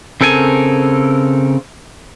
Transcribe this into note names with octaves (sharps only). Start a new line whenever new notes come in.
C#3 C4 A4 A#4 G#5